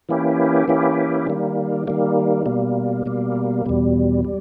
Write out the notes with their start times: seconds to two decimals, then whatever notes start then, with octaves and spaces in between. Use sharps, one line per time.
0.09 E3 A#3 C#4 E4 G4
0.68 E3 A#3 C#4 E4 G4
1.27 D#3 G3 A#3
1.87 D#3 G3 A#3
2.46 B2 G3 A#3
3.06 B2 G3 A#3
3.66 E2 B2 G3
4.25 G3